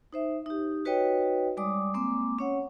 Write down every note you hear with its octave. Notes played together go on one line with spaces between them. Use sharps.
D#4 C5 E5
D#4 G4
D#4 F#4 B4 C#5 D#5 G5
G3 G#3 D5 D6 D#6
G#3 A#3 C4 D6
C#4 C#5 F#5